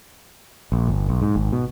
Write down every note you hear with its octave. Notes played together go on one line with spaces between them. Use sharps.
A#1
G1
B1
G#2
G#1
B2